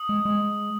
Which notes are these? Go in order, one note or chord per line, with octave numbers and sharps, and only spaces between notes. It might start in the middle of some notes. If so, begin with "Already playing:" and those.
Already playing: D#6
G#3
G#3